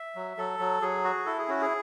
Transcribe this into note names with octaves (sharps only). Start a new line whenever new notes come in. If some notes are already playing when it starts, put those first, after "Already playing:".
Already playing: E5
F#3
F#3 A4
F#3
F#3 G#4
F#4
E4 A4
G#4
C#4 F#4
G#4